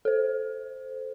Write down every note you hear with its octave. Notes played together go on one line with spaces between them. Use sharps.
A4 C5